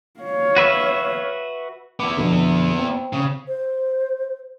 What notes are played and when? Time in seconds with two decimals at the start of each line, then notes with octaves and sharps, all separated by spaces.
0.21 C#5 F5
0.56 F#4 B4 E5
2.00 B3 E4 D6
2.17 F2 B2 D3
2.79 C4
3.13 C#3
3.48 C5